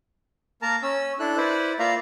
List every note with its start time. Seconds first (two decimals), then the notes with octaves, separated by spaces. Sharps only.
0.62 A#3 A#4 A5 A#5
0.83 C#4 E6
1.20 D4 E4 A4 F#6
1.37 E4 B4 C5 D5
1.79 A#3 F4 D5 E5 F5 A#5